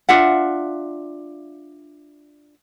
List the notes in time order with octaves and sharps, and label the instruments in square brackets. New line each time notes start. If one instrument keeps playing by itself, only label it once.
[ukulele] D4 F4 E5 F#5